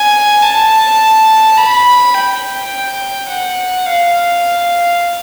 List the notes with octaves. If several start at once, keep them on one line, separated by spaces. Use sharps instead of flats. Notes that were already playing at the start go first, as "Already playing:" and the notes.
Already playing: G#5
A5
B5
G5
F#5
F5